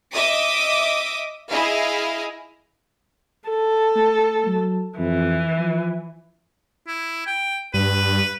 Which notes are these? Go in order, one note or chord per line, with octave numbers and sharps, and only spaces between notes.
D#5 E5 D6 D#6
E4 G#4 D#5 F5
A4
A3
F#3
F2 E3
F3
E4
G5
G2 B4